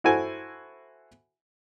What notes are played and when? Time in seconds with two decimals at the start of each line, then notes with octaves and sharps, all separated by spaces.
0.04 E4 F#4 A4 C5 G#5